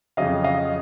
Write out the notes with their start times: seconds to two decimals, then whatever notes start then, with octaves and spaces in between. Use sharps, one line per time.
0.17 F2 C#3 F#3 D#5 F5
0.44 D#5 F5